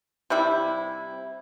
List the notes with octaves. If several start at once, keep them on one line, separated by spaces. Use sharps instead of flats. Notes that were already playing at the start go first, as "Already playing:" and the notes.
C3 G3 E4